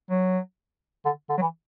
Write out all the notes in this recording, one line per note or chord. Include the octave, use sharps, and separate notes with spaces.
F#3
D3
D3
F#3
E3